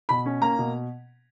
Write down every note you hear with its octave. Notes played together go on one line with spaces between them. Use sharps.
B2 B5
C#4
A#3 A#5
B2